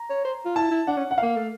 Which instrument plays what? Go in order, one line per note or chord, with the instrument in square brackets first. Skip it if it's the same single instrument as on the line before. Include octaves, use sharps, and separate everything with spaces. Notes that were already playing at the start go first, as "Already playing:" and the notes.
Already playing: [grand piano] A#5
[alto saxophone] C#5
C5
F4
[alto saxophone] E4 [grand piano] A5
[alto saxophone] E4
[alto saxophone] D4 [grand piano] F#5
[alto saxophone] C#4
[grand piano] F#5
[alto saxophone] A#3 [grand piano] F5
[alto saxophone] A3